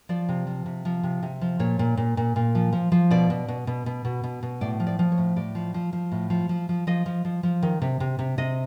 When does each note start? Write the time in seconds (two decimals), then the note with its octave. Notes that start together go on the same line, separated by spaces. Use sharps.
0.09 F3 D5
0.29 C3
0.47 F3
0.66 C3
0.85 F3
1.03 C3
1.23 C3
1.41 F3
1.59 A#2 C#5
1.79 A#2
1.97 A#2
2.17 A#2
2.36 A#2
2.55 F3
2.73 F3
2.92 F3
3.11 B2 D5
3.30 B2
3.48 B2
3.67 B2
3.86 B2
4.05 B2
4.24 B2
4.43 B2
4.61 A2 D5
4.80 F3
4.87 D5
4.99 F3
5.12 C#5
5.18 A2
5.36 A2 D5
5.55 F3
5.74 F3
5.93 F3
6.12 A2
6.30 F3
6.49 F3
6.69 F3
6.87 F3 D#5
7.06 F3
7.25 F3
7.43 F3
7.62 D#3
7.82 C3
8.00 C3
8.19 C3
8.38 C3 D#5